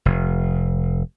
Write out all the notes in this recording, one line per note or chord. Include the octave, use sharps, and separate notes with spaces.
F1